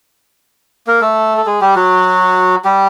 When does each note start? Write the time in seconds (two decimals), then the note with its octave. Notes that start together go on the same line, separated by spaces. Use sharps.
0.87 A#3 A#4
1.02 A3 A4
1.38 A4
1.46 G#3 G#4
1.61 G3 G4
1.76 F#3 F#4
2.65 G3 G4